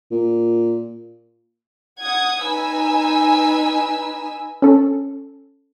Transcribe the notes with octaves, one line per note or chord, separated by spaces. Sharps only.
A#2
F#5 D#6 G#6
D#4 B4 G#5 E6
C#4 A4